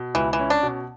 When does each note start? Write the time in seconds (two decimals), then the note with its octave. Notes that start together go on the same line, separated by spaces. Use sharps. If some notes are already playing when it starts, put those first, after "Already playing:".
Already playing: B2
0.14 C#2 E3
0.33 E3
0.39 C#4
0.50 D4
0.63 B2